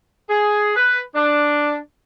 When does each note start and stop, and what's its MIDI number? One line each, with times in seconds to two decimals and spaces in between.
0.30 0.74 68
0.76 1.00 71
1.15 1.76 62